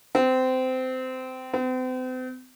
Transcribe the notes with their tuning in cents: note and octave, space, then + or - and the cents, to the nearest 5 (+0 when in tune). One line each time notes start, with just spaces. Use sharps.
C4 -20
C4 -40